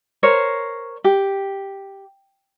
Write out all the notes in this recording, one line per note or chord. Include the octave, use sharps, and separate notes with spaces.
A#4 C5 C#5
G4